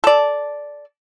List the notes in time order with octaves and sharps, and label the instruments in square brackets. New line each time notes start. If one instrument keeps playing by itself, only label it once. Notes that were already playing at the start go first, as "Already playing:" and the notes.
[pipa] A4 D5